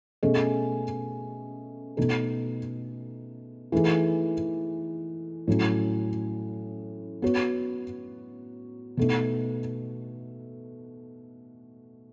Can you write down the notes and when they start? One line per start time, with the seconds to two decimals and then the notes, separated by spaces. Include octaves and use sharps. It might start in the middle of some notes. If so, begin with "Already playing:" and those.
0.23 B2 A3 C#4 G#4 D#5
1.97 B2 A3 D#4 A4
3.72 E3 A3 D#4 G#4
5.48 A2 F#3 C#4
7.22 B3 F#4 C#5
8.97 B2 A3 D#4